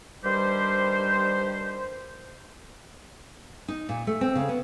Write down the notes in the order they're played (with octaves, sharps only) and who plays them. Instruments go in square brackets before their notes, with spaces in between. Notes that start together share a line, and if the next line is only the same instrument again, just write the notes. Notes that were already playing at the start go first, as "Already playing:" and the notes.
[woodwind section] G2 D#3 G3 G4 C5
[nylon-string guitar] D#4
A#2
A3
C4
C#3
B3